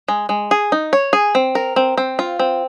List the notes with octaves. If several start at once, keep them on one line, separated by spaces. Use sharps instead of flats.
G#3
G#3
G#4
D#4
C#5
G#4
C4
A#4
C4
C4
F4
C4